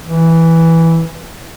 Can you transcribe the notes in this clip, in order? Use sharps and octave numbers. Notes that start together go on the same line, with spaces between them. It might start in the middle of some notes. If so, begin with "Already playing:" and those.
E3